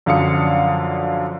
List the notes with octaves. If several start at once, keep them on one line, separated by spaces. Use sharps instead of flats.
F#2 D3 F3 F5 D#6 C#7